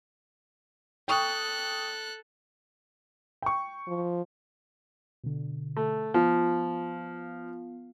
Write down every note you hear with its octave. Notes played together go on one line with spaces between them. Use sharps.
A4 G5 C#6 D#6 F#6
G5 C#6
F3
B2 D3
A3
F3 B3 F4 F5